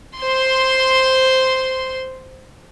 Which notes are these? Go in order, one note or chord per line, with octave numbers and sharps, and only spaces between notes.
C5 C6